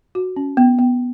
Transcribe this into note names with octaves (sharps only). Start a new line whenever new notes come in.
F#4
C#4
B3
B3